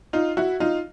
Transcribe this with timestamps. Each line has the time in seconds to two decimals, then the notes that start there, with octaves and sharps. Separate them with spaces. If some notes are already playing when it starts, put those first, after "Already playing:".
0.13 D#4 F4
0.37 E4 F#4
0.60 D#4 F4